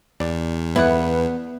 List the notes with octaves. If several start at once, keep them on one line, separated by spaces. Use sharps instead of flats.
E2 D5
B3 E4 B4 D5 F#5